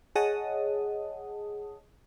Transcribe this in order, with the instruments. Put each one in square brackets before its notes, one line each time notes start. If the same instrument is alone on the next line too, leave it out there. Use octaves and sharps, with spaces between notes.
[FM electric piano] G#4 C#5 D#5 F#5 A5 D#6